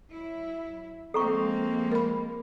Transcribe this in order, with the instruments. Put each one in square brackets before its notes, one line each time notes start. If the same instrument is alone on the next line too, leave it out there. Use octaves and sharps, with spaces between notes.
[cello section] F#3 E4
[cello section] F3 G#3 A#3 [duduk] C4 [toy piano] A4 A#5 C#6
[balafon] A#4 B5